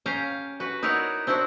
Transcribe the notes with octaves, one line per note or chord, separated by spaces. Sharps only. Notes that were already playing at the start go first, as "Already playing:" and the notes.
C#4 G4 F5 A#5
F#4 B4
D#4 E4 F#4 A#4 C#5 D5
C4 D4 E4 F#4